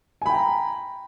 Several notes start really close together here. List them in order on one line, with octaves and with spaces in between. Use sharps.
G#5 B5 G5 A#5